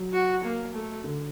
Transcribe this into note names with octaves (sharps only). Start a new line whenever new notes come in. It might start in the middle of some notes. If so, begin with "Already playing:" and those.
Already playing: F#3
F#4
A#3
A3
D3